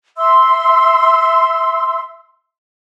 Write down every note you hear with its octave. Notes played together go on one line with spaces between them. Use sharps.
E5 C6 E6